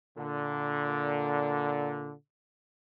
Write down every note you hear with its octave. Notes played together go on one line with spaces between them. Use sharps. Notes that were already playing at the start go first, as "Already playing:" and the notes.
A#2 D3